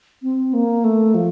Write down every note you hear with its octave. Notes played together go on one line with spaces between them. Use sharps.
C4
A#3
A3
F3